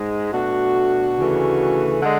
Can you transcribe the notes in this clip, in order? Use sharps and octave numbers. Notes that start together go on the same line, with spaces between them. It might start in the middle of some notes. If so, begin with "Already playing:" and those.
Already playing: G#2 G#3
B2 A3 D4 F#4
D2 C#3 E3 A3
D3 G#3